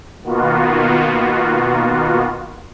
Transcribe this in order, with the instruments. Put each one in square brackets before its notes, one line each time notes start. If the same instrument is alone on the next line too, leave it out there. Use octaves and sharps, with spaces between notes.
[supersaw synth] B2 D#3 A#3 B3 F4 F#4